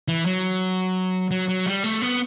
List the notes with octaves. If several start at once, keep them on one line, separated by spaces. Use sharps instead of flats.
E3
F#3
F#3
F#3
G3
A3
B3